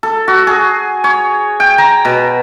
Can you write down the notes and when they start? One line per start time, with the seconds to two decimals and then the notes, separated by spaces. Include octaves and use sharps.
0.03 A4
0.28 F#4
0.47 G#4
1.04 C#5
1.60 G5
1.78 A#5
2.05 B2